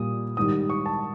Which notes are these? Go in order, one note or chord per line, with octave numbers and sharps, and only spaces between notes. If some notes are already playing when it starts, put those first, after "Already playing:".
Already playing: A#2 G3 D#6
G#2 D#3 G3 D#6
C#6
A5